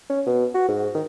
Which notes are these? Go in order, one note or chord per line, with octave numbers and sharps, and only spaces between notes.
C#4
B2
F#4
G#2
D#3